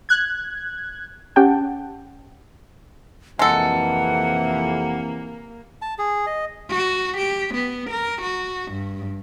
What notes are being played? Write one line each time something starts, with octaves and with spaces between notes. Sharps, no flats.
F#6 G#6
C#4 G4 F#5 G5 A5
F2 C3 E3 G#3 A#3 A4 F#5
A5
G#4
D#5
F#4
G4
B3
A#4
F#4
G2